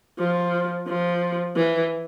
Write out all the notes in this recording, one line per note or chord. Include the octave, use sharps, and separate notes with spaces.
F3
F3
E3